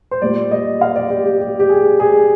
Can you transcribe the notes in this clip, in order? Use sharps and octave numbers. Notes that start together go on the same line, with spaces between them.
C5
A#2 G3 A#3 F4 D5
D#5
F5
D5
G4
G4
G4
G4
G#4
G#4